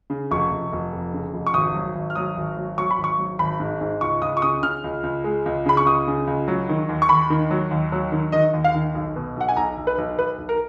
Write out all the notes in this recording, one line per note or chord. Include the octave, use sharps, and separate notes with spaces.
C#3
F1 C#6
F1
F1
F2
C#3
F1
C#6
G#1 D#6
F#3
G#1
F6
F#3 D#6
G#1
F#3
F#3 C#6
B5
G#1
C#6
F#3
G#1 B5
G#2
G#2
C#2 C#6
C#2 D#6
C#6
C#3 D#6
C#3 F6
C#2
C#2
G#3
C#2
C#3 B5
C#6
C#2 D#6
C#3
C#2
F#3
D#3
D#2
C#6
D#2 B5
D#3
F#3
D#2
F#3
D#3
D#3 D#5
D#2
F5
D#3
B1
B2
B1 F#5
G#5
B1 A#5
B1
B4
B1
B1 B4
B1
A#4